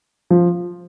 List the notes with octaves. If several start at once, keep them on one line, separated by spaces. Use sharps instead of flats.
F3